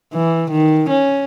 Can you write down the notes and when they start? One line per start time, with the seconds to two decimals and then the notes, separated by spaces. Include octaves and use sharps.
0.14 E3
0.52 D#3
0.90 C#4